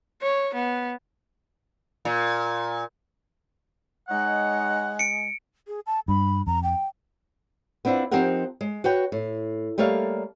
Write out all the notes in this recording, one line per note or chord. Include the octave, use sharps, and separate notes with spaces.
C#5
B3
A#2
G#3 D#4 C#5 F#5
C#7 D7
G#4
A5
G2 B5
F2 A#5
G5
B3 C4 D4 E4 F4
F3 C4 D#4 G4 A#4 F#5
G#3
F#4 B4 C#5 G5
A2
G3 A3 A#3 C#5 D5 F5